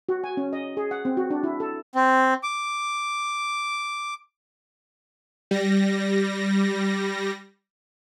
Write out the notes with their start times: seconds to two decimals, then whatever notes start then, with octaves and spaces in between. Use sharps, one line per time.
0.09 F#4
0.24 G#5
0.37 C#4
0.53 D#5
0.77 G#4
0.91 F#5
1.05 C4
1.17 F#4
1.30 D4
1.43 E4
1.60 A4
1.95 C4
2.43 D6
5.51 G3 A#6